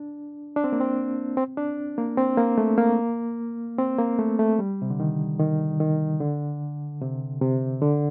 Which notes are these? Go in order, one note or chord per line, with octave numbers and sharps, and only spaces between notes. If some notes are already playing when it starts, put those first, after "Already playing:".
Already playing: D4
D4
C4
A#3
C4
C4
D4
A#3
C4
A#3
A3
A#3
C4
A#3
A3
A3
G3
C3
D3
D#3
D#3
D#3
D3
C3
C3
D3